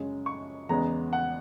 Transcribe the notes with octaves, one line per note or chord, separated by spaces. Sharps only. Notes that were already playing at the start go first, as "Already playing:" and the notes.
Already playing: F#2 C#3 G#3 C#4
C#6
E2 C#3 G#3 B3 A#5
F#5